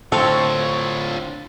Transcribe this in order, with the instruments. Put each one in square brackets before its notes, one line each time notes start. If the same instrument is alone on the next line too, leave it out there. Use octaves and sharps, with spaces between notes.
[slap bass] A2 D3 [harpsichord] C4 C#6 [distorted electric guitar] F4 C#5 [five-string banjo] A4